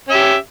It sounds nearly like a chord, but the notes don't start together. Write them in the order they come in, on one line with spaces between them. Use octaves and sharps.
C#4 E5 G4